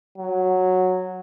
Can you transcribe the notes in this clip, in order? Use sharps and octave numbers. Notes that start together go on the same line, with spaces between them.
F#3